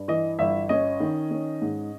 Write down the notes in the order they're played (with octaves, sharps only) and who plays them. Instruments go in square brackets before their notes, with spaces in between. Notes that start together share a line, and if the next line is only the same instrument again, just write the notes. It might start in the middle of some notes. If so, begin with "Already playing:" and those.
Already playing: [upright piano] G2
E3 D#5
G1 E5
C#4 D#5
D#3
C#4
G#2